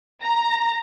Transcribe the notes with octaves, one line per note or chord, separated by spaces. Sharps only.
A#5